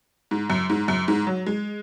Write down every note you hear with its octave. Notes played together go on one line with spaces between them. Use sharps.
G#2
F#2
G#2
F#2
G#2
F#3
G#3